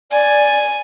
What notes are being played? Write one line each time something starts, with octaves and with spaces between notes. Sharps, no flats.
D5 G#5